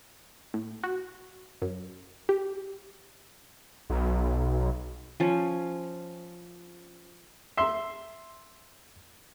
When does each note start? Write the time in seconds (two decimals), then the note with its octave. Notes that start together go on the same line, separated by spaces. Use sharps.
0.54 A2
0.83 F#4
1.62 F#2
2.29 G4
3.90 B1
5.20 F3 C#4
7.57 E5 C6